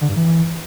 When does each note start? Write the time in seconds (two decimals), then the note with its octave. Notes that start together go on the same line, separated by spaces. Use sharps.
0.01 D3
0.09 G2
0.16 E3